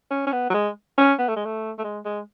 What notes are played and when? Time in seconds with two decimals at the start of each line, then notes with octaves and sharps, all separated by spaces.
0.11 C#4
0.27 C#4
0.32 B3
0.50 F#3
0.54 G#3
0.98 C#4
1.19 B3
1.28 A3
1.36 G#3
1.45 A3
1.79 A3
1.84 G#3
2.05 G#3